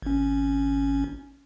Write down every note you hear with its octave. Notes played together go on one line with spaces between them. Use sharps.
G#1 C#4